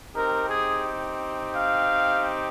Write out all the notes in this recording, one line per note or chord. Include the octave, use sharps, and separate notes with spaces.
C4 D#4 G4 A#4
G#4
F5